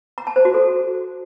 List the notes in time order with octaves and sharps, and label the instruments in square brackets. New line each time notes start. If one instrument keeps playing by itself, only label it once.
[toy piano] A#5
A5
C5
F#4
A4